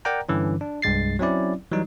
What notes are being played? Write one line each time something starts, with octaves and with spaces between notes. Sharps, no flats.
A#4 D5 F#5 G5 A#5
G2 D3 E3 C#4
D4
C2 G2 G#3 A6 C7
F#3 C4 C#4 E4 D5
E3 F#3 G3 D#4